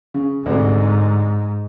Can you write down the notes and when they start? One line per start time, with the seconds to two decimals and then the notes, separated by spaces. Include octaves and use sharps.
0.14 C#3
0.46 D2 G#2 C3